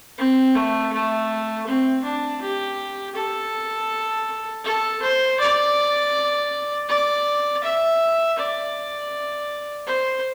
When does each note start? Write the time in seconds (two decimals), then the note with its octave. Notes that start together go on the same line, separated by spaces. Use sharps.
0.18 C4
0.55 A3
0.92 A3
1.67 C4
2.04 D4
2.41 G4
3.15 A4
4.64 A4
5.02 C5
5.39 D5
6.89 D5
7.63 E5
8.37 D5
9.87 C5